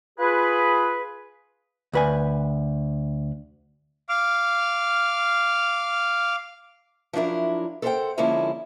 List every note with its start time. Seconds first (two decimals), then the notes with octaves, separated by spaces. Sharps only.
0.18 F4 G#4 B4
1.93 D2 B4 G#5
4.09 F5 D6 F6
7.13 F3 F#3 D4 E4 A#4
7.82 A4 A#4 C5 D#5 F#5 G5
8.18 D3 F3 G#3 A#3 C#4 E4